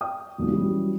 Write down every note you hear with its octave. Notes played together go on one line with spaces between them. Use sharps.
G5 D#6
E1 B1 A#2
E3 F#3 G3 C#4 F#4